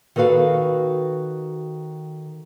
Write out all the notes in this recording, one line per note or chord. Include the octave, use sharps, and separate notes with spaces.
D#3 F#4 A4 B4 F5